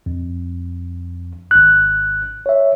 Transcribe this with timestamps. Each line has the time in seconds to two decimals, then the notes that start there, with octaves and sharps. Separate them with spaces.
0.06 F2
1.51 G#1 F#6
2.46 C#5 E5